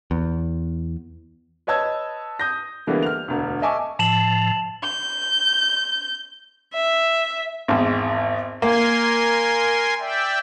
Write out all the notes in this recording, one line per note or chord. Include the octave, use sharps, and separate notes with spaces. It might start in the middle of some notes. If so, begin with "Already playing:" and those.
E2
B4 C#5 D#5 A5 E6 G#6
D#6 G6 A#6
D3 E3 G3 G#3 A#3 B3
F6 F7
E1 D2
D#5 E5 G#5 A5 C#6 D6
A2 F3 A5 E7 F#7
G6
E5
G#1 E2
A#3 A#4 G#5 C6
D5 E5 G5